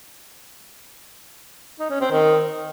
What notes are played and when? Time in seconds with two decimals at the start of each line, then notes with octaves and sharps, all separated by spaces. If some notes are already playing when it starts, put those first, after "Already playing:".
1.79 D#4
1.90 C#4
2.00 C4
2.11 D#3